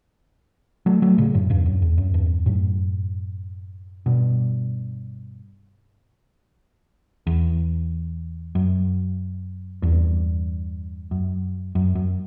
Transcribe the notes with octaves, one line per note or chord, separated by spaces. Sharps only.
F#3 A3
F#3 A3
A2 C#3
F#2 A2
E2 G2
F#2
E2
F#2
E2 G2
F#2 A2
G2 B2
E2
F#2
E2 G2
F#2
F#2
F#2